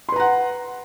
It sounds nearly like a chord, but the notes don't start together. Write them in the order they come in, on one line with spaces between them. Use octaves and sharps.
C6 B4 A#5 F#5